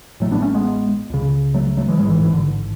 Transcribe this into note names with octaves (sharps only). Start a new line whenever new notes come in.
A1 A2 F#3 A3
B3 D4
A3 C#4
G#3 B3
C#2 C#3
F#3 A3
F#3 A3
E3 G#3
A1 G#2 E3 G#3
E3
E3
D3